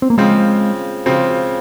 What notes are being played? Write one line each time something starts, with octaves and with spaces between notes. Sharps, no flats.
C4
A#3
C#3 F3 G#3 C4
C#3 F3 C4